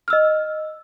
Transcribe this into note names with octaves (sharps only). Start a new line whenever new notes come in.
D#5 E6 F6